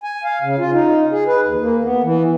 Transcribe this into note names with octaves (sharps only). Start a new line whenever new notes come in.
G#5
F5
C#3
F4
D#4
G#4
B4
D#2
A#3
B3
E3